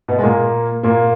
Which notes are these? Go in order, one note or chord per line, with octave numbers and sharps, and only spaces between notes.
B2 B3
G#3
A#2 A#3
A#2 A#3